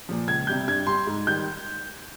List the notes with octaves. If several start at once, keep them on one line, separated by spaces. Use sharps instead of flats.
A#2 F3
C#2 G#6
C3 G3 G6
G2 G#6
G3 C6
G#2
D#3 G3 G6